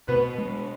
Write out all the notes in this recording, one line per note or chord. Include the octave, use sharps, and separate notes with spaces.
B2 B3 B4
G#3